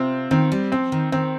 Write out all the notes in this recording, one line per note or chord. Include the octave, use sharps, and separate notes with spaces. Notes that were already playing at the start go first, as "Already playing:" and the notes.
Already playing: C3 C4 F4
D#3 C4
G3
F3 C4
D#3
D#3 C4